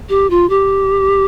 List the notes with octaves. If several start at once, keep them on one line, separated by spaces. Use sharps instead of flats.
G4
F4
G4